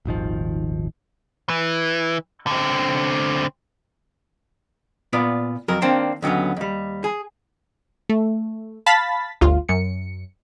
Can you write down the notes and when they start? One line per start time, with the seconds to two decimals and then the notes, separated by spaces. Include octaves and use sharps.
0.05 D#1 G#1 D#3 F3
1.49 E3
2.47 D3 C4
5.13 A#2 B3 F4 D5
5.68 F2 F#3 A#4
5.82 D#3 A#3 C4 D4
6.22 D#2 D3 F#3 B3 C#4
6.57 D#2 G3
7.04 G#4
8.09 A3
8.86 F5 A5 B5 A6 B6
9.41 G1 D2 F4
9.69 F#2 C#7